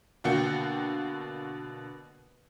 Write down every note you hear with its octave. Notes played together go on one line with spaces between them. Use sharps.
B2 D3 A#3 F#4 G5 C#7